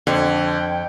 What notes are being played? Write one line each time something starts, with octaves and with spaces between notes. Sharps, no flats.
F2 D3 G5